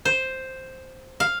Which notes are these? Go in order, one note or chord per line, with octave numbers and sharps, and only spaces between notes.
C5
F5